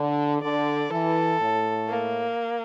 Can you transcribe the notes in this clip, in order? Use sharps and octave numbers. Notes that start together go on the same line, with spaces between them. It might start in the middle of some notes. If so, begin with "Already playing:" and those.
Already playing: D3
D3 D5
E3 A4
A2
A#3